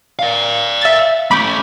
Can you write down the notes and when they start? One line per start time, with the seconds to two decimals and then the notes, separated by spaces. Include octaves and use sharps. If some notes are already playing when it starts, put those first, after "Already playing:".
0.19 D5 F5
0.81 E5 A6
1.31 A3 C#4 B5 D6 G6